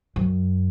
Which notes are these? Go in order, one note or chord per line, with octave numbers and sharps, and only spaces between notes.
F#2